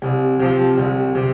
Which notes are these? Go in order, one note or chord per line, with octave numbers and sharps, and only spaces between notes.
C2
C3 F3
C2
C3